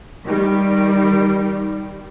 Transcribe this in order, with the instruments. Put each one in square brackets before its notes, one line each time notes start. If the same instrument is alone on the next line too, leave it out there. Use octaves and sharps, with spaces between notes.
[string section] D#3 G3